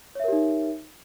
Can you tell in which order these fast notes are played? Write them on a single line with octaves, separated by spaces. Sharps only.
C#5 E5 A#4 G4 D#4